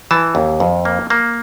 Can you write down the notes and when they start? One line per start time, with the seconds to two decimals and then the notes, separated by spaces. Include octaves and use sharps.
0.11 E3 A5
0.35 D#2
0.60 F2
0.85 A#3
1.10 A#3